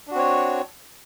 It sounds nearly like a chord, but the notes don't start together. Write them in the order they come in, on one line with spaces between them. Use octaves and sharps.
D4 F#4 C4 C#5